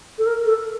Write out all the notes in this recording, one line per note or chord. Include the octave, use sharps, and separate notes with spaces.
A4
A#4
A4